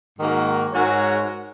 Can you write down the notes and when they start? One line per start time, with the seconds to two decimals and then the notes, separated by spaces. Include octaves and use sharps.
0.16 G#2 D#3 A#3 F#4
0.72 G#2 G#3 F#4 A#4 C#5